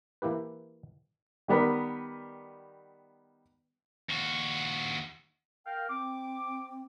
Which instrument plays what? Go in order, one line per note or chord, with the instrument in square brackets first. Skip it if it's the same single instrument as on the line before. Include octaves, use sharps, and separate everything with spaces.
[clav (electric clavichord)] E3 A#3 E4 G4 B4
[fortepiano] D#3 G3 B3 A#4 B4
[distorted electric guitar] D#2 F#4
[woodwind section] A#4 F5 G5
[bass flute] C4 [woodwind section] D6